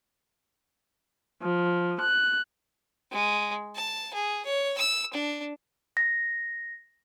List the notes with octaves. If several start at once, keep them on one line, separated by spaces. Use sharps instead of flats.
F3
F#6
G#3
A5
G#4
C#5
E6
D4
A#6